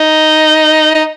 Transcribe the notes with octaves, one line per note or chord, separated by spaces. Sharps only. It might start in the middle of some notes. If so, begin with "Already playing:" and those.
Already playing: D#4
D#4